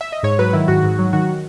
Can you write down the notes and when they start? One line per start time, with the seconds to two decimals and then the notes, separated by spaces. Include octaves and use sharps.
0.01 E5
0.12 D#5
0.23 G#2 C#5
0.39 F#3 B4
0.53 D#3 E4
0.68 G#2 F#4
0.83 G#2
0.99 F#3
1.13 D#3 F#4